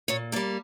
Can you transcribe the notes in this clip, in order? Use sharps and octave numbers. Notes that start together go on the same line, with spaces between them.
A#2 C#5
G3 A#3 D5